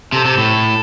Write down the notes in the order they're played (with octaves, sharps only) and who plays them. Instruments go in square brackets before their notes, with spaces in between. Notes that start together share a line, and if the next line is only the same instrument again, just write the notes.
[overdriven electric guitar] C3 [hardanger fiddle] A4
[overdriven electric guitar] C3
A2